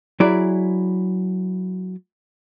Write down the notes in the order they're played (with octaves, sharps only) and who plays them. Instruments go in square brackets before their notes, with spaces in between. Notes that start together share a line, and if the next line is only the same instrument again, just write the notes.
[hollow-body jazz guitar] F#3 E4 G#4 D5